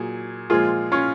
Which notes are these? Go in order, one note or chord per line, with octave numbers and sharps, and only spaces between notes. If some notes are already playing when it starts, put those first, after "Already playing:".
Already playing: A#2 F#3 G#4
A#2 F3 G#3 F4 G#4
C#4 F4